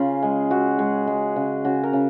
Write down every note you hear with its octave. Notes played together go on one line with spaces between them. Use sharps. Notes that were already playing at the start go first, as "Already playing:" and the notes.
Already playing: C#3 F4
G#3
G#3 F#4
G#3
G#3
C#3
C#3 F#4
A#4
C#3